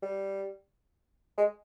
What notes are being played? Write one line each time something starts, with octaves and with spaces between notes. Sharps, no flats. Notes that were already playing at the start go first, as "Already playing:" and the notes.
G3
G#3